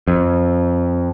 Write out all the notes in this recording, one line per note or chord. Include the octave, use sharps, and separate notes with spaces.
F2